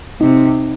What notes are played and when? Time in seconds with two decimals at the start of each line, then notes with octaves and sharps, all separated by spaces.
0.21 C3 D#4